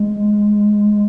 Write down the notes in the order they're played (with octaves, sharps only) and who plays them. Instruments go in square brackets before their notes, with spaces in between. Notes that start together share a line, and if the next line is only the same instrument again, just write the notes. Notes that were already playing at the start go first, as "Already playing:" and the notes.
Already playing: [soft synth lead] G#3